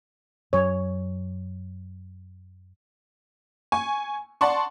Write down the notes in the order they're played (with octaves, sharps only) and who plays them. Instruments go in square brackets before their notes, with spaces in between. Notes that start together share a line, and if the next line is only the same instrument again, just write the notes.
[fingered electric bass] F#2 F#3 [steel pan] C#5
[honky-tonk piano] G#5 C#6
D5 F#5 A5 C6 C#6